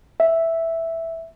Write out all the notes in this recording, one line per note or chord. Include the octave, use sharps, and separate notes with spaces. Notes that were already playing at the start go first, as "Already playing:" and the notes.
E5